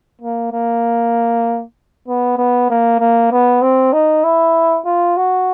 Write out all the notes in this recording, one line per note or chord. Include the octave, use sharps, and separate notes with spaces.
A#3
A#3
B3
B3
A#3
A#3
B3
C4
D#4
E4
F4
F#4